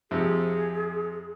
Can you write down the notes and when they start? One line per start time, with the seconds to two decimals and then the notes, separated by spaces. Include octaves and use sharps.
0.11 F2 C3 G#4